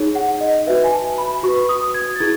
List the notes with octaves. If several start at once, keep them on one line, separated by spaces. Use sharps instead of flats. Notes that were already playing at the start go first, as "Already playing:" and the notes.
Already playing: D#4 G#4 C#5
F#5
D#5
F#4 B4 E5
G#5
A5
B5
F#4 B4 C#6
D#6
G#6
A6
E4 G#4 G#6